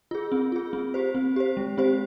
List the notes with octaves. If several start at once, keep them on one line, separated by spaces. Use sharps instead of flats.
F4 G#4
C4
F4 G#4
C4
G4 C5
C4
G4 C5
G#3
C4 G4 C5